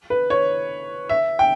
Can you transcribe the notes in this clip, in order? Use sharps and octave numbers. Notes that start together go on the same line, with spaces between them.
B4
C#5
E5
G5